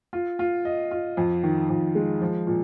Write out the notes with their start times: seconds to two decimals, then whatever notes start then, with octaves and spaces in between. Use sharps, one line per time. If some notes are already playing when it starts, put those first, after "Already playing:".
0.13 F4
0.39 F4
0.65 D#5
0.91 F4
1.17 F2
1.43 D#3
1.69 F2
1.95 G#3
2.21 F3
2.47 A#2